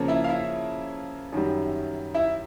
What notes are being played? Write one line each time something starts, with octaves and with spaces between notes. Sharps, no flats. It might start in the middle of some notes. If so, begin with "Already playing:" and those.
Already playing: C#3 F3 A#3 C#4
E4 E5
F5
E4 E5
F#2 D#3 G3
E4 E5